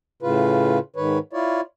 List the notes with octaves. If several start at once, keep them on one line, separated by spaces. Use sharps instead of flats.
A2 C#3 F4 B4
G#2 D#3 B4 C#5
E4 F4 C#5 D5